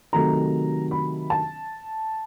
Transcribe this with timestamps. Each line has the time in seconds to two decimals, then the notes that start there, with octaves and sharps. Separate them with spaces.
0.13 C3 D#3 F#3 A3 A#5
0.91 B5
1.30 A5